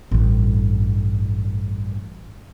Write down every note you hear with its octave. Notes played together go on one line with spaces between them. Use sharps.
A1 G2